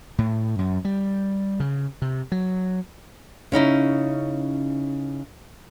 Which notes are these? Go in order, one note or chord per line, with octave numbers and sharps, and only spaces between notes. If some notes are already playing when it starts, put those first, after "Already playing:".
A2
F#2
G3
C#3
C3
F#3
C#3 C#4 D#4 E4